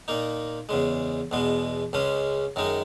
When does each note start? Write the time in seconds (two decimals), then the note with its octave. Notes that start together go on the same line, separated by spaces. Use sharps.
0.08 A#2 A#3 D#4
0.69 E2 C#3 G#3
1.31 E2 B2 G#3 B3
1.93 C#2 C#3 G#3 C#4
2.56 F#2 D#3 G#3 D#4